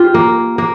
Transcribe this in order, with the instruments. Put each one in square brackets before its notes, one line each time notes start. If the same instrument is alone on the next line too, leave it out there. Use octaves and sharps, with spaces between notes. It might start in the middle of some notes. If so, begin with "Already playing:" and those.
Already playing: [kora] F4 G4
A#3
A#3